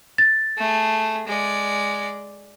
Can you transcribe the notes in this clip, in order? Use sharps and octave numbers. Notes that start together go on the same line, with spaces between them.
A6
A3 G#4
G#3 D5